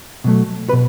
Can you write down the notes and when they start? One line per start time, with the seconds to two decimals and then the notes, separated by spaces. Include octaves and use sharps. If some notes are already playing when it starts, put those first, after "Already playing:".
0.24 B2 F#3 A3
0.69 B4
0.73 B2